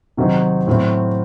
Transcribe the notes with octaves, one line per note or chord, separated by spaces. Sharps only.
C3 D#3 F#3 C4 D#4
A2 F#3 C4